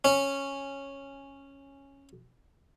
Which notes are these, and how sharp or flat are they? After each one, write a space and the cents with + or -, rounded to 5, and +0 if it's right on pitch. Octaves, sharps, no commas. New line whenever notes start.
C#4 -5